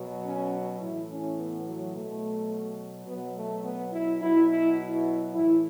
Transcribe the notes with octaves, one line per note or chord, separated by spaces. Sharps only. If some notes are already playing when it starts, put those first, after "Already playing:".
Already playing: B2 F#3
C#4
A2 E3 E4
C#4
B3
F#3
B2 F#3 A3
B2 F#3 B3
A3
B3
E4
B2 F#3 E4
E4
E4
A2 E3 E4